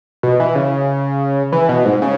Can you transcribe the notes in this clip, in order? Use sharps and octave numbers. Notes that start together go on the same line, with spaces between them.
B2
E3
C#3
E3
B2
G#2
C#3